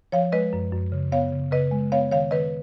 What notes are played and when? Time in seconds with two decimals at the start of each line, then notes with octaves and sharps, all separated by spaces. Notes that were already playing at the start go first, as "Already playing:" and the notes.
0.12 F3 C#5 F5
0.32 G#3 B4 D#5
0.53 F#2
0.73 F#2
0.92 C#3
1.12 B3 C#5 F5
1.32 C#3
1.52 C#3 B4 D#5
1.71 G#3
1.92 B3 C#5 F5
2.11 D#3 C#5 F5
2.31 D#3 B4 D#5